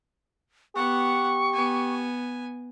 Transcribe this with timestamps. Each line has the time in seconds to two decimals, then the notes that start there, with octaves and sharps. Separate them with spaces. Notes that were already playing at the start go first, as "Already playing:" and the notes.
0.76 B3 G4 F#5 C#6
1.54 B3 G#5